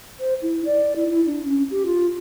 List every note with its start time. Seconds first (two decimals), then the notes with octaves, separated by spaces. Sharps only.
0.20 C5
0.42 E4
0.65 D5
0.96 E4
1.10 E4
1.26 D4
1.45 C#4
1.71 G4
1.86 F4